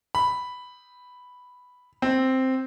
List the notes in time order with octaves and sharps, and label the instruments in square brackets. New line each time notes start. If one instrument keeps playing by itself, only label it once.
[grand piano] B5
C4